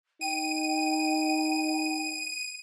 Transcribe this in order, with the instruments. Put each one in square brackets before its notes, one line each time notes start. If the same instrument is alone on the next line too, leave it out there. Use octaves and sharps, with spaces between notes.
[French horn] D#4 [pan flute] G5 [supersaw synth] D#7